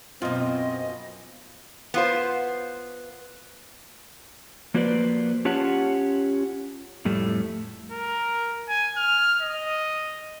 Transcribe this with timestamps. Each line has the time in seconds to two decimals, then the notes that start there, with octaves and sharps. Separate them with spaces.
0.22 F#2 B2 C4 F4 D#5
1.94 B3 F4 C5
4.74 F3 A#3 F#4 B4 C5 D5
5.45 C#4 F4 G4 C#5 F#5 A5
7.05 F2 A2 G3 A3
7.91 A#4
8.68 G#5
8.97 F6
9.42 D#5